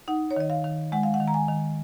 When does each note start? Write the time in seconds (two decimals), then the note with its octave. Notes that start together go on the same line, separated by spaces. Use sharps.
0.08 D#4 F#5
0.31 C#5
0.36 D#3 D#5
0.50 F5
0.64 D#3
0.92 G#3 F#5
1.03 F5
1.14 F#5
1.20 D#3
1.28 A#5
1.34 G#5
1.48 D#3